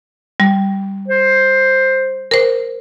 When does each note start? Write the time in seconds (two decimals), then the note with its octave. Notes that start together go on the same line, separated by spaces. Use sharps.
0.40 G3
1.08 C5
2.31 A#4 C5